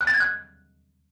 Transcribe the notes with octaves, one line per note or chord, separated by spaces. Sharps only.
F#6
A6
G#6
F#6